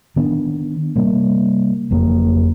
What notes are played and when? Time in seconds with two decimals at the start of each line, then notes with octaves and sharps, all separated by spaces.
0.16 D#3 B3 D4
0.96 C3 G3 A#3
1.91 F#1 F2 A#3